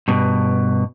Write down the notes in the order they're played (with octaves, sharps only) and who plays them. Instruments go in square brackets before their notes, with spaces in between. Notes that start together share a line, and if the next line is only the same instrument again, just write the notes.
[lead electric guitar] G2 B2